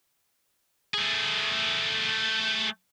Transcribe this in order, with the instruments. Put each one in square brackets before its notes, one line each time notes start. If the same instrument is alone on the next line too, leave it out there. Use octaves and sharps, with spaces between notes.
[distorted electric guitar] A3 G#4